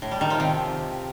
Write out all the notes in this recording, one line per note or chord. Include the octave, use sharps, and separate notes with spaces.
A2
G3
D#3
F3
C3